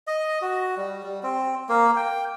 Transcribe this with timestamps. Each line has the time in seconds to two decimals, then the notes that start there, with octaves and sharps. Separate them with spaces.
0.07 D#5
0.42 F#4
0.77 G3
1.03 G3
1.23 C4
1.69 A#3
1.96 G5